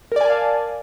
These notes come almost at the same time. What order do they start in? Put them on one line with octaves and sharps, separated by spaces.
A#4 D5 G#5 A5 F5